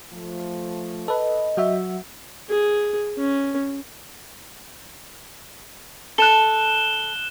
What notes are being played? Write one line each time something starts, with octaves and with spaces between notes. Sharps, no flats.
F3 A3
A4 B4 D#5
F#3 F#4 E5
G#4
C#4
A4 F#6 E7 G7